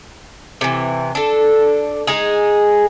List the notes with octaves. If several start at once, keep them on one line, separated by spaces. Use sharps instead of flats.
C3 E3
D4 A4
G#3 D#4 G#4